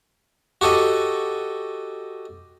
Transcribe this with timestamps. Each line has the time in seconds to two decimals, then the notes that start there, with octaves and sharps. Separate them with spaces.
0.61 F#4 G4 A4 D#5